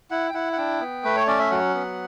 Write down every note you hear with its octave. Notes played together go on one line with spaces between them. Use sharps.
E4 F#5
G5
E4 F#5
F#5
D4 G5
B3
A3 B4
C#5
C#4 D5
E5
F#3 F#5
B3